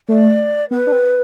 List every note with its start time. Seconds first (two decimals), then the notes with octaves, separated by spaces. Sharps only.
0.08 A3 D5
0.71 B3 B4
0.87 D4
0.92 C4